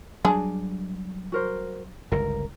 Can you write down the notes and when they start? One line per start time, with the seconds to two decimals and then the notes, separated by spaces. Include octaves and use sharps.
0.25 F#3 G3 D4 G#4
1.32 F#4 A#4 C5
2.12 G1 C#2 A#4